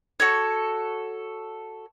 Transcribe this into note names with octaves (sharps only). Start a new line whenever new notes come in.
F#4 A4 C#5